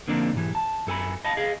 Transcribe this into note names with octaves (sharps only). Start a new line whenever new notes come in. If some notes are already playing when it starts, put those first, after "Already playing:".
D3 F3 A#3 C4 D4 D#4
B1 G#2 E3
A5
F#2 A4 G#5 B5
D#5 F5 A5 B5
G#4 D#5 F5